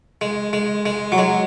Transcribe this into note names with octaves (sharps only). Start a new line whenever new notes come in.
G#3
G#3
G#3
F#3
G#3